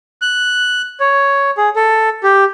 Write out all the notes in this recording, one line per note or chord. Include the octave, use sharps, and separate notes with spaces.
F#6
C#5
G#4
A4
G4